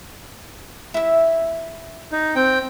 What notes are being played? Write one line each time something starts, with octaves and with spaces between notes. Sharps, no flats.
E4 E5
D#4
C4 G5